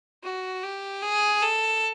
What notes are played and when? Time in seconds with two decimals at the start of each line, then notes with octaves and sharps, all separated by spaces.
0.23 F#4
0.63 G4
1.02 G#4
1.42 A4